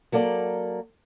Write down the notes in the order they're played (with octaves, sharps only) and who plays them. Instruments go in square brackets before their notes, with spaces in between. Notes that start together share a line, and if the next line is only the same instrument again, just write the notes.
[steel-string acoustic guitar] F#3 A#3 A4 D5